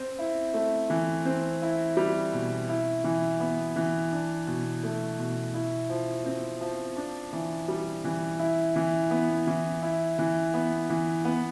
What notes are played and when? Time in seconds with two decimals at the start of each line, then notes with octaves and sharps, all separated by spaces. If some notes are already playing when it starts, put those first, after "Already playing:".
Already playing: C4
0.19 E4
0.54 A3
0.90 E3
1.25 C4
1.62 E4
1.97 G3
2.33 B2
2.69 E4
3.04 E3
3.40 B3
3.76 E3
4.12 D4
4.47 B2
4.83 A3
5.19 B2
5.54 E4
5.89 F3
6.26 C4
6.61 F3
6.96 D4
7.33 E3
7.68 G3
8.04 E3
8.39 E4
8.76 E3
9.11 B3
9.47 E3
9.82 E4
10.19 E3
10.54 B3
10.90 E3
11.25 B3